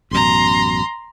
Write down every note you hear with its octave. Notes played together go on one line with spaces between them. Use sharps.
A1 F#2 B2 A#5 C6